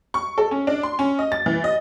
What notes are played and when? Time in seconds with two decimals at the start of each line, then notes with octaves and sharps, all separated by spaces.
0.14 C#6
0.38 A4
0.51 C#4
0.67 D4
0.83 C6
0.99 C#4
1.19 D#5
1.32 A6
1.46 E3
1.64 D#5